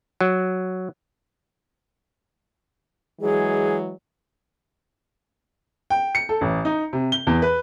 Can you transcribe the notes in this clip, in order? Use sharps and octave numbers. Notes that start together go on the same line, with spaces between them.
F#3
E3 F#3 G#3 G#4
G5
C#7
A4
A1
D#4
C3
G7
E2
B4